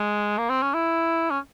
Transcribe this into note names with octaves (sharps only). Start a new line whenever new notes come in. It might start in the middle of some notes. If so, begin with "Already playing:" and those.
Already playing: G#3
A#3
C4
C#4
E4
C#4